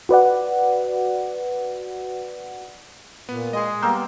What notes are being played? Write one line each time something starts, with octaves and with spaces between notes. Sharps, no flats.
F#4 B4 D5 F#5
A#2 B3
G#3 G#4 D#5
G3 A#3 B3 G5 E6 F6 G6